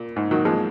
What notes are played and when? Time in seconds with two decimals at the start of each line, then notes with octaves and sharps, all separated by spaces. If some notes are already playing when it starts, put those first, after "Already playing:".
Already playing: A#2
0.16 G#2
0.31 D#3 F#3
0.45 F3 G#3